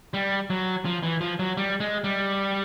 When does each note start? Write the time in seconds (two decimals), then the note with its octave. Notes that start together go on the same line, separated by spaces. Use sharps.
0.14 G3
0.50 F#3
0.85 F3
1.03 E3
1.21 F3
1.39 F#3
1.57 G3
1.80 G#3
2.04 G3